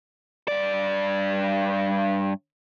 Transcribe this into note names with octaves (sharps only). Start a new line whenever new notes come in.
G2 D5